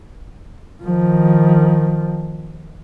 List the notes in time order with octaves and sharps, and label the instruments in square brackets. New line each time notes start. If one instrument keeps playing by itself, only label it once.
[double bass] D#3 F3